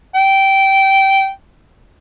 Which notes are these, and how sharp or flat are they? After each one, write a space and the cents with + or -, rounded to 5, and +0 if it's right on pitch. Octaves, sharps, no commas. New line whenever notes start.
G5 -15